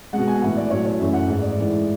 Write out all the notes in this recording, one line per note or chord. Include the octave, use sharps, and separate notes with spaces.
B2 G#3 F#5
G#5
A2 E3 A3 F#5
D5
A2 F#3 A3 C#5
C#5
F#2 E3 A3 E5
F#5
G#2 G#3 F#5
D5
A2 E3 G#3